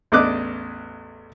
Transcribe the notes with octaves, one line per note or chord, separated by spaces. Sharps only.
A1 E2 D4 D#5 D6 F#6